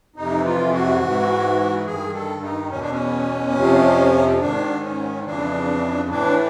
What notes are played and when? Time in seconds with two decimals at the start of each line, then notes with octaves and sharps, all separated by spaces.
0.16 F2 C3 E3 D#4
0.45 F4
0.73 F#4
1.01 G#2 E3
1.86 G2 D#3 G#4
2.14 A4
2.42 D#4
2.70 E2 B2 C#4
2.80 D4
2.91 C#4
3.55 F2 C3 F3
4.40 G#2 D#3 D4
4.82 C#4
5.25 F2 C#3 E3 D4
6.09 A2 E3 D4